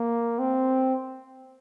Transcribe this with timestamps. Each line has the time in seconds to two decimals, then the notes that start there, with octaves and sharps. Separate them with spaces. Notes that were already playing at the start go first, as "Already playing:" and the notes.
Already playing: A#3
0.39 C4